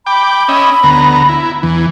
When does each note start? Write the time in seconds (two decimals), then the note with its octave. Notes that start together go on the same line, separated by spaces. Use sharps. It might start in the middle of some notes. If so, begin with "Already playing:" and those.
0.07 G5 B5 D6
0.48 C#4 D#5 E5
0.83 D2 B3 A#5
1.29 E4
1.63 E2 E3